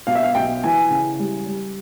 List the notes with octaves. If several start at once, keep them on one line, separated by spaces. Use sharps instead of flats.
B2 F5
E5
F5
B1 G5
E3 G#5
C#3
G3
G3